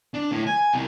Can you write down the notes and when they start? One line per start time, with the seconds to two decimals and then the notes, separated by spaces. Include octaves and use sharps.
0.14 D4
0.32 A2
0.47 G#5
0.74 C2